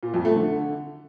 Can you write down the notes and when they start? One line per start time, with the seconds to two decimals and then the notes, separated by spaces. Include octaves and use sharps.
0.03 A#2
0.14 F2
0.25 A3
0.36 D3